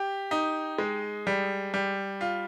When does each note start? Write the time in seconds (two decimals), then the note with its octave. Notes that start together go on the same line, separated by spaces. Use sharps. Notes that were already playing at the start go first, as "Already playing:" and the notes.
Already playing: G4
0.31 D#4
0.78 G#3
1.27 G3
1.74 G3
2.21 F4